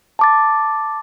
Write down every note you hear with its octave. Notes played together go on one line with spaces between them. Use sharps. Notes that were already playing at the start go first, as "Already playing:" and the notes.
A5 D6 A6